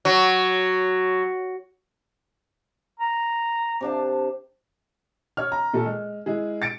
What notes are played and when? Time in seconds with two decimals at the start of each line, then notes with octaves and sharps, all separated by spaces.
0.05 F#3
2.99 A#5
3.81 C3 D4 A5
5.37 C#5 F6
5.52 A#5
5.73 A#2 A3 A4
5.85 G#3
6.26 G#3 E4 G#4
6.62 A6 C#7 D7